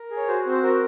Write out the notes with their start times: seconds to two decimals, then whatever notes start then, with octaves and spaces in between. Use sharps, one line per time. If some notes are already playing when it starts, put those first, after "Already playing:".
Already playing: A#4
0.10 G#4
0.17 C#5
0.28 F#4 C5
0.46 C4
0.51 C5
0.63 F#4 A#4